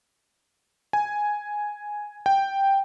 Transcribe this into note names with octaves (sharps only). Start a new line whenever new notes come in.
G#5
G5